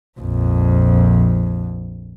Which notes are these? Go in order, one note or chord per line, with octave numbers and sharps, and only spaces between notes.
A#1 F2